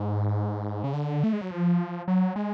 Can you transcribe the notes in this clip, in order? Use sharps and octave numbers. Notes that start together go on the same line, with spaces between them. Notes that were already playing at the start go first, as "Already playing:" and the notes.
Already playing: G#2
C#3
D3
A3
G#3
F#3
F3
F#3
G#3